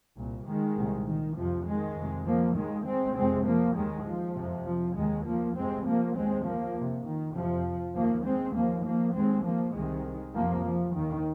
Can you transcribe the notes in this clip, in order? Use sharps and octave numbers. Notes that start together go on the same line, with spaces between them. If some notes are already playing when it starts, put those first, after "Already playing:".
C2 A#2
D#3 G#3
C2 A#2
D#3
F2 C3 F3
D#3 G#3
F2 C3
F3 A#3
D#2 D#3 G#3
G#3 C4
F2 C3 G#3 C4
F3 A#3
D#2 D#3 G#3
F3
F2 C3
F3
D#2 D#3 G#3
F3 A#3
F2 C3 G#3 C4
F3 A#3
D#2 G#3 C4
F3 A#3
F2 C3
D#3
F2 C3 F3
D#2 F3 A#3
G#3 C4
D#2 F3 A#3
F3 A#3
D#2 G#3 C4
F3 A#3
C2 C3 D#3 G#3
F2 C3 F3 A#3
F3
D#2 D#3